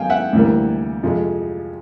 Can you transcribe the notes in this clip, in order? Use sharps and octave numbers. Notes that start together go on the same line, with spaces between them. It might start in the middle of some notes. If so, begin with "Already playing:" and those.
Already playing: G#2 D#3 F#3 B3 F5 G5 G#5
E5 F#5
D2 C3 E3 G3 A#3
F2 C3 F3 G#3